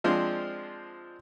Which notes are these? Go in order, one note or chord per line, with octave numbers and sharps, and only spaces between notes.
F3 G#3 C4 D4 F4